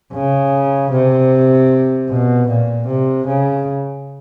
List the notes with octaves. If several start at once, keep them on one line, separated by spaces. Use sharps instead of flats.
C#3
C3
B2
A#2
C3
C#3